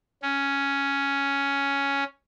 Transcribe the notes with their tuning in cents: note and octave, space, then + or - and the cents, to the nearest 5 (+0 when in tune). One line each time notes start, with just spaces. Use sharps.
C#4 +5